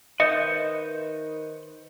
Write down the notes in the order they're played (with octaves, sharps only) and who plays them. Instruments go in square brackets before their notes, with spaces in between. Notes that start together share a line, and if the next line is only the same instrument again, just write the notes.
[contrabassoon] D#3 [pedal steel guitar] B4 C5 G6 [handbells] D#5 [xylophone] E5 D#6 C#7